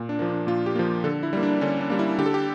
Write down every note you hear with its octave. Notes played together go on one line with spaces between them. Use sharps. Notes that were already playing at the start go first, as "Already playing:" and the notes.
Already playing: A#2
D4
F3 A#3
D4
A#2 F4
G4
F3 A#3
D3 A4
E4
G3 A#3
D4
D3 C#4
D4
G3 A#3
E4
D3 G4
A4
G4